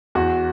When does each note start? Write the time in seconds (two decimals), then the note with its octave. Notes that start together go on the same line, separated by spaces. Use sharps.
0.15 E2 F#4